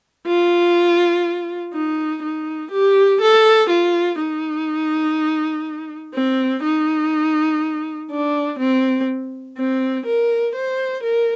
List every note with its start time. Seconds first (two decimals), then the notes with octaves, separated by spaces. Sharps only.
0.27 F4
1.74 D#4
2.22 D#4
2.72 G4
3.21 A4
3.69 F4
4.19 D#4
6.14 C4
6.63 D#4
8.10 D4
8.59 C4
9.57 C4
10.06 A#4
10.55 C5
11.03 A#4